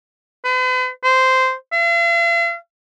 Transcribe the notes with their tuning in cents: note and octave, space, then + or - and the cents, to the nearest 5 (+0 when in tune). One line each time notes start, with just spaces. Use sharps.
B4 +45
C5 -10
F5 -45